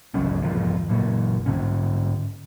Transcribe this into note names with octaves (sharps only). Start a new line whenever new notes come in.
G1 C#2 F#3 C#4
E2 G#2 D#3 F3
F#1 A#2 F#3
G#2 D3 C#4